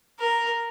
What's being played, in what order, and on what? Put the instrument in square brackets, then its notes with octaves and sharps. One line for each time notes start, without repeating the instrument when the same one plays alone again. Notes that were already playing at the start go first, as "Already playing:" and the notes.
[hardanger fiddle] A#4